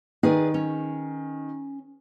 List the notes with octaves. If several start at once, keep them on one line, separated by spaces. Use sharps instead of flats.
D#3 G#4 B4 D5
C#4